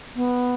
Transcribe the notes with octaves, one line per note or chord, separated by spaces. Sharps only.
B3